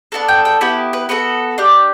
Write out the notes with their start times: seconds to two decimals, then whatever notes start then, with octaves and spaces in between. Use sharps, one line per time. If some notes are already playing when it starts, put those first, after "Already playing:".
0.12 B3 D4 F#4 A4 A5
0.28 G5
0.45 G5
0.61 B3 E4 G4 G5
0.93 B4
1.09 B3 F#4 A4 B4
1.58 D4 G4